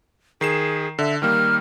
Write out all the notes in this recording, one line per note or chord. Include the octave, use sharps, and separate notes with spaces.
D#3 G#4 C7 E7
D3 E5
D#3 G3 A#3 F6